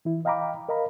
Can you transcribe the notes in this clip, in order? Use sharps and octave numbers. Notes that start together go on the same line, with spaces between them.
E3 E4
D#5 F5 G5 A#5 B5 D6
A#4 D#5 F5 A#5 B5